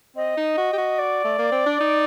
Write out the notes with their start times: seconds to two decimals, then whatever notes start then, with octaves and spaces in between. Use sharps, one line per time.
0.16 C4 D#5
0.37 D#4
0.58 F#4
0.73 G4
0.78 F#4
0.98 D5
1.24 A3
1.38 A#3
1.51 C4
1.66 D4
1.80 D#4